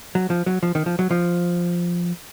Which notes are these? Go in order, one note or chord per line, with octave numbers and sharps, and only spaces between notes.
F#3
F3
F#3
F3
D#3
F3
F#3
F3